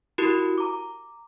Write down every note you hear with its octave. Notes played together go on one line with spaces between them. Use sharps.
E4 F#4 G4 A#4
A#5 D6